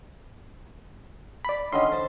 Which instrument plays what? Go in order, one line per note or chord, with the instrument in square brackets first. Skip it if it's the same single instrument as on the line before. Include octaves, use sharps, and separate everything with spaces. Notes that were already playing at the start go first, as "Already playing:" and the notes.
[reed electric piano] D5 B5
[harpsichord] D3 D#3 C#4 [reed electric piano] D#5 C6
[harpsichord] C5 A5